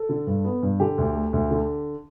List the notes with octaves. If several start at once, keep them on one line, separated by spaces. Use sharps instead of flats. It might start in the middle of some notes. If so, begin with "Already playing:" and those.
Already playing: A4
D3
G2
B3
G2
D3 G4
D2
A3
D2
D3